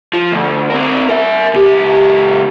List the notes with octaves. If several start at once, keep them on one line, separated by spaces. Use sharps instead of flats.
F3
D2
C4 A#4
A#4 E5
C#2 G4